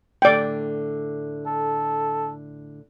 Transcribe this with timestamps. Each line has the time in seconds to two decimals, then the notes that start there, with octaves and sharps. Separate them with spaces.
0.22 A2 D3 D5 G5
1.46 A4